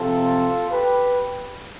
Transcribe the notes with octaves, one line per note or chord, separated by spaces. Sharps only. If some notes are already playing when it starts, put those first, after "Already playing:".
Already playing: C3 F3 C4 F4 A4
G4 B4